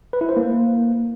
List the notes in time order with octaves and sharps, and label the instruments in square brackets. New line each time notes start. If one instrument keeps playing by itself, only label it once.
[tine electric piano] B4
E4
C5
A#3